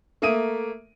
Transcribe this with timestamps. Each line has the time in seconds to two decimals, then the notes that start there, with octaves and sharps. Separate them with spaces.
0.22 A3 A#3 E5 D#6 D7 D#7